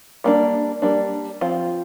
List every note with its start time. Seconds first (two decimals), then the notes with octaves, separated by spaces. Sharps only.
0.24 G3 A#3 D4
0.82 G3 A#3 D4
1.41 F3 C4 F4